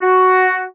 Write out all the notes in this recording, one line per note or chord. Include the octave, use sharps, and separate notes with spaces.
F#4